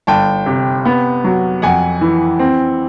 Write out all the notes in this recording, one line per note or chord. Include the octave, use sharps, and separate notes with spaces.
G1 G5 A5
C3
B3
F#3
F2 F#5 G#5
E3
C4